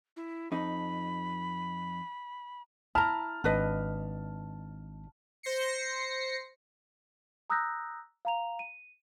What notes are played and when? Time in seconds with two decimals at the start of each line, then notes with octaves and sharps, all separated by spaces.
0.17 E4
0.52 F2 D#4 B5
2.95 E4 A5 A#5 F6
3.44 G#1 D4 B4 D#5
5.43 C5 A#6 C7 C#7
7.50 A#5 D#6 E6 F#6 G6 A#6
8.25 F5 A#5 F7
8.59 D#7